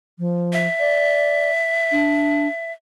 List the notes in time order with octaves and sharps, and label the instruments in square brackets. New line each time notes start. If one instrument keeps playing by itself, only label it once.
[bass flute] F3
[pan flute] E5
[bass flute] D5
D4